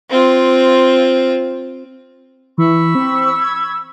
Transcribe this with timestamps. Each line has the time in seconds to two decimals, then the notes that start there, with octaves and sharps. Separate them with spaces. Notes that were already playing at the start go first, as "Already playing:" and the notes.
0.10 C4 F4
2.58 E3 B5 C#6 E6
2.95 C4
3.39 G#6